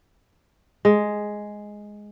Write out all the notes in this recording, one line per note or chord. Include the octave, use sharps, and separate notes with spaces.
G#3